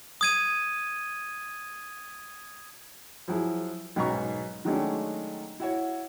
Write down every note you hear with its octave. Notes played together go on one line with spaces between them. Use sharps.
D#6 G#6 D#7
F3 F#3 E4 G#4
B1 G#2 B2 C#4 A#5 C#6
D#3 F#3 G#3 A3 C#4 D4
E4 F#4 C#5